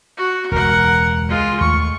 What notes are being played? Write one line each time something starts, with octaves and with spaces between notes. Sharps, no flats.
F#4
E1 C#2 A#4 F#5
G#3 F4
D#2 A3 C#6